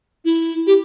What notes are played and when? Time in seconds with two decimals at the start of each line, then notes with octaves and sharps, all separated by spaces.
0.25 E4
0.67 G4